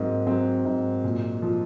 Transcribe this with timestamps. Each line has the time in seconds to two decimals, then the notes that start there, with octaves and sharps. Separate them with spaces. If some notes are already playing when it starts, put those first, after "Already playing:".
Already playing: G#2 F#3 A#3 C4
0.27 F#3 C4
0.65 G#2
1.04 A#2
1.42 F3